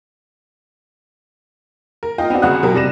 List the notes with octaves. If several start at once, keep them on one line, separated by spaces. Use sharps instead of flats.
A#4
F4 D#5 F5 G5
B3 C4 D4 F#4
G1 C#3 F#4 F#5 D#6 F#6
B2 F#3 G4 A#4
C3 G3 A#6 E7